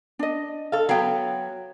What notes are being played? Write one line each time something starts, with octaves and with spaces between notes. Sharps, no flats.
D4 D#5
A4 F5
F#3 B3 F5 G5